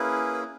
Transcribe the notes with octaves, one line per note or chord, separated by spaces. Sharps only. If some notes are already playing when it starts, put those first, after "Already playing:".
Already playing: A#3 C#4 E4 G#4 B4